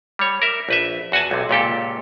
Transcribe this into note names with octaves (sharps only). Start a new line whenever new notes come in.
G3 C#5
A#4 E5
A#1 B4 E5
E2 F#4 F#5 G#5 A5
B1 C3
C#2 A#2 G4 A4